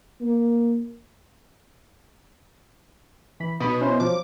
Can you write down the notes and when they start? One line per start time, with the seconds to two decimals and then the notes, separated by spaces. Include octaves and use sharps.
0.21 A#3
3.40 E3 B5
3.60 B1 B2 B5 D#6
3.81 C#4 E4 C5
4.00 F3 F#3 D6